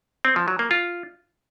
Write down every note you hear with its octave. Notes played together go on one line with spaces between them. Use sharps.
C4
F3
F#3
A#3
F4